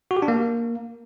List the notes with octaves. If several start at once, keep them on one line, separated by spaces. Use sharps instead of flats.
F#4
G4
D4
A#3